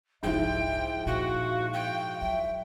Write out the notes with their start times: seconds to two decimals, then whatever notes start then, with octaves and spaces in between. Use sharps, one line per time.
0.23 F1 C2 G#2 F3 E4 E5 G5
1.06 A#2 F#4 F5
1.73 G5
2.22 F#3 E5